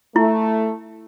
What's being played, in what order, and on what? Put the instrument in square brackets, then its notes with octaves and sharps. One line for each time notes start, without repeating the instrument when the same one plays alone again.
[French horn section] A3 [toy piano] E4